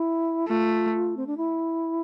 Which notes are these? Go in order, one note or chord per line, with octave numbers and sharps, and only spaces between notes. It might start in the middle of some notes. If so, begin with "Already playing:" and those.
Already playing: E4
A3 F4
C4
D4
E4